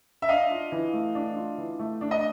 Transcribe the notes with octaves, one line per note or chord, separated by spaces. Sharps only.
E5
D4 D#5 F5
F4
E3
A3
D4
F4
E3
A3
D4
D#5